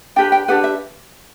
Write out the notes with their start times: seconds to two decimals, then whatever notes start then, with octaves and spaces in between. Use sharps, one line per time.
0.16 D4 G4 B4 G5
0.32 G5
0.48 D4 G4 B4 F#5
0.64 E5